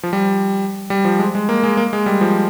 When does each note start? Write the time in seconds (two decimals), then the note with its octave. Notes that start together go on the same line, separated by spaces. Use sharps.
0.03 F3
0.13 G3
0.90 G3
1.05 F3
1.19 G#3
1.35 G#3
1.49 A#3
1.64 G#3
1.77 A#3
1.93 G#3
2.06 G3
2.21 F3